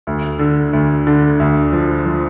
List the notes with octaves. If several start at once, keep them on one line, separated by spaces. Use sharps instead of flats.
D2
D3
D2
D3
D2
F3
F3